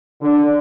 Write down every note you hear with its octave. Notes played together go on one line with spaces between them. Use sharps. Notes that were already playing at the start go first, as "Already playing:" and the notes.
D3